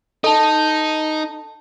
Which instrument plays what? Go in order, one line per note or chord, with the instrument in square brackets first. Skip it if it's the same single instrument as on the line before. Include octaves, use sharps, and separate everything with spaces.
[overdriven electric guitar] D#4 [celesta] A4 A5